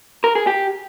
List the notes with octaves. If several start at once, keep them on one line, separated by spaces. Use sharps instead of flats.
A#4
G#4
G4